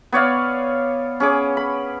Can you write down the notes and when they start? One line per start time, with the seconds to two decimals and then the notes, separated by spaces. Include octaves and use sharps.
0.12 B3 C#5 D5 F5
1.20 C#4 G#4 D6
1.57 B5